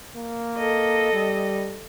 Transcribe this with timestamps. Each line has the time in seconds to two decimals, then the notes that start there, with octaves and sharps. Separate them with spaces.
0.16 A#3
0.58 A4 D#5
1.13 G3